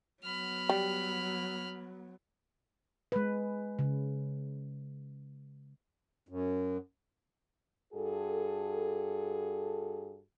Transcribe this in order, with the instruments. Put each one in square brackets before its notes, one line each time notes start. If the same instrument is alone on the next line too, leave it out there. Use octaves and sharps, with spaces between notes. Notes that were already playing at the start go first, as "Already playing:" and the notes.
[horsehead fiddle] F#3 B3 [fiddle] B5 F6
[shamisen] G3
[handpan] G#3 B4
C#3
[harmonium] F#2
[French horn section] G2 F#4 G#4 A4